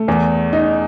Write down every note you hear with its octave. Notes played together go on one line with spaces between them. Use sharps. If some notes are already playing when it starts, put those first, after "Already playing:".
Already playing: A3
E2
D#4